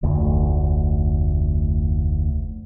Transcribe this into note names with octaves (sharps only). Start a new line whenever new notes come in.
F1 D2